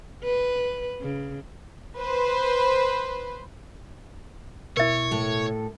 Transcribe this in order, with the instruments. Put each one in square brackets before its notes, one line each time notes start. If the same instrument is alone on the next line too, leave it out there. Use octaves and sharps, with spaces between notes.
[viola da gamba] B4
C#3
[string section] B4 C5
[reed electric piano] B2 E4 [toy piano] A#4 E5 [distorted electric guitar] C#5
[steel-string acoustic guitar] A2 A4